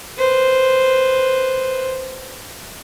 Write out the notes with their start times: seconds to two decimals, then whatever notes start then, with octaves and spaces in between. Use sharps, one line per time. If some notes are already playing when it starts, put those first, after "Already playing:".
0.18 B4 C5